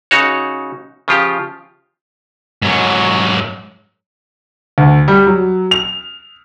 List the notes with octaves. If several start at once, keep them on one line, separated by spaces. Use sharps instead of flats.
C#3 D#4 F#4 C#5
C#3 F3 F4 G4
G#2 F#3
D2
G3
F#3
F7